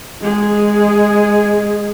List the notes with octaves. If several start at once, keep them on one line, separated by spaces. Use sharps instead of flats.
G#3 G#4